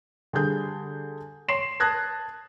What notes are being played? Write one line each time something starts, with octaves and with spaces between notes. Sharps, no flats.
D3 G3 G#4 G6
C#5 C6 C7 E7
A5 D#6 F#6 G#6 A#6